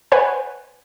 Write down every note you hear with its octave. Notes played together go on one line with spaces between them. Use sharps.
B4 C5 F#5 G#5 F#6